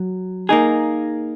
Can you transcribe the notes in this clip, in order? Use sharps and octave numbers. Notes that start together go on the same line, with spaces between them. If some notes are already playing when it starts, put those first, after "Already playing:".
Already playing: F#3
A#3 D#4 G#4